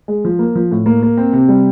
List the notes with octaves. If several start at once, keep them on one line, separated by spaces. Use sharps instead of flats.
G#3
F3
A#3
F3
A2
A#3
A#3
C4
C3
G3